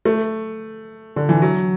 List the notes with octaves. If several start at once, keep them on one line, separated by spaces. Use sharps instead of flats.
A3
D3
E3
F#3